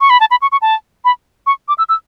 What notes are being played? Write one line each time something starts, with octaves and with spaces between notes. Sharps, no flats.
C#6
B5
A5
B5
C#6
C#6
A5
B5
C#6
D6
E6
E6